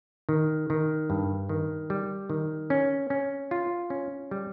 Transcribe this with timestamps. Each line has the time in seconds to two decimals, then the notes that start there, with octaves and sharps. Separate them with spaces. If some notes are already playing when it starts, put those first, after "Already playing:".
0.29 D#3
0.70 D#3
1.10 G2
1.49 D#3
1.90 G3
2.30 D#3
2.70 C#4
3.10 C#4
3.51 F4
3.90 C#4
4.31 G3